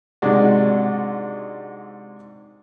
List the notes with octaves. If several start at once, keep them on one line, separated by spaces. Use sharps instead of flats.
G#2 C3 G#3 D4 F#4 D5